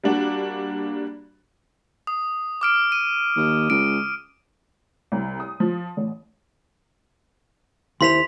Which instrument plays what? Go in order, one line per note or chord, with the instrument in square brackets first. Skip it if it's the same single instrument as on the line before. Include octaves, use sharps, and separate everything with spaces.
[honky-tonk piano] G3 A#3 D4 F#4
[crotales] D#6
D6 F6 D7
D#7
[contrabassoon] D#2
[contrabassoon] C#2 [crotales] D7
[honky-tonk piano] C2
D#6
F3
A1
[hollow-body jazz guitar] D#2 E4 C5 [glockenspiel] C6 B6 F7